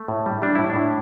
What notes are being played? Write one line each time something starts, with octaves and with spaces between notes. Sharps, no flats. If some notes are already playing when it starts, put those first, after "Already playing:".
Already playing: A3
A2
G3
G3 D4
A2 E4
D4
A2